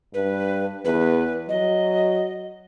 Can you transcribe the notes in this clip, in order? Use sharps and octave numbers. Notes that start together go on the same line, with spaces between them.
G2 B4
E2 B4
F#3 D#5